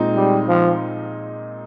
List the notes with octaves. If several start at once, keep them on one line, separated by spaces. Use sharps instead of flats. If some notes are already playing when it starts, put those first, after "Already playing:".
Already playing: A#2 G#3 C4 D#4
G3
F3